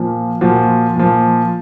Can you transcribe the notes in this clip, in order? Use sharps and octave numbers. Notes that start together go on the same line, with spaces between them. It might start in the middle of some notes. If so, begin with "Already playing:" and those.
Already playing: A#2 F3
A#2 F3 F#4
A#2 F3